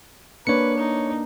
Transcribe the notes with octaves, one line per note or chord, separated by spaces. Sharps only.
A#3 D4 B4 C#5 C#7
D#4